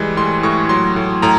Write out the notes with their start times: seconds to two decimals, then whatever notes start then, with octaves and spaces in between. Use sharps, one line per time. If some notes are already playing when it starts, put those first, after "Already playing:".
Already playing: E3 G3 G#3
0.17 A2 C6
0.43 A2 C#6
0.69 F#3 C6
0.96 A2
1.22 A2 A#5